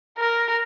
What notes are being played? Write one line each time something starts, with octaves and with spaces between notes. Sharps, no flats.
A#4